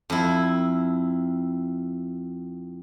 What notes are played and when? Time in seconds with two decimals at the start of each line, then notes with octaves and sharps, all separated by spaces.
0.10 F2 E4